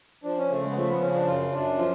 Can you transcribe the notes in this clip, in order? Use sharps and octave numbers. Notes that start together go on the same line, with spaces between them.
F3 D4
C#4
C#3 A3
G#3
B3
F3 A3
B3
C#3 C#4
D4
F#2 F4
F#2 D4
F3 F4